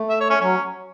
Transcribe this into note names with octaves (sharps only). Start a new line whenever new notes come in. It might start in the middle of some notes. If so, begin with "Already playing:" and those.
Already playing: A3
E5
C#5
C#4
F#3 C#4